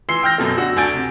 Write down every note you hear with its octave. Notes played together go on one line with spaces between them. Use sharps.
E3 C6 E6 C7 G7
G5 F6 G6 A#6
F#2 B2 A3
D3 F#4 E6
D2 D4 G#5 G6 A6 D7
C3